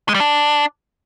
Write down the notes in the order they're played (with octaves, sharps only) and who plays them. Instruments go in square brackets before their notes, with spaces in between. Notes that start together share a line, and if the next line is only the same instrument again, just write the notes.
[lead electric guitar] G#3
G3
D4